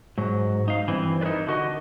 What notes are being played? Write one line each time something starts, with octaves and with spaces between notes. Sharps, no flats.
G#2 F#3
D#4 F5
G2 E3 C4
D#4 E4 A#4 B4 D5
D3 F#4 D#5